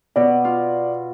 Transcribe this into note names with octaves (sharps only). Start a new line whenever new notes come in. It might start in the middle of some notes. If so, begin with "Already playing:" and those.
B2 D5
F4